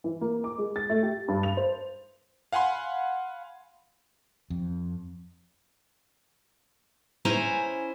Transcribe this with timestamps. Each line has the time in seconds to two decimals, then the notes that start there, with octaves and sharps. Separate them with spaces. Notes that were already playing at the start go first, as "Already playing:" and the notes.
0.04 E3
0.21 A#3
0.44 D6
0.58 G#3
0.76 A6
0.90 A3
1.03 G4
1.28 G2
1.43 F7
1.57 C5
2.53 F5 F#5 G#5 B5 C6
4.50 F2
7.25 C#4 E4 C5 G#5 A#5